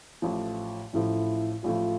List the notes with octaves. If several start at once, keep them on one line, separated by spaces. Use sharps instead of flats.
A1 A2 F3
A1 A2 F3 E4
A1 A2 F3 F4